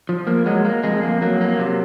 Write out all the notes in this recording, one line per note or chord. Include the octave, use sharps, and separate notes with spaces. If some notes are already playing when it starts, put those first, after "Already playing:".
F3
A#3
F#3 G#3
A#3
F2 G#3
A#3
F#3 A#3
A#3
C3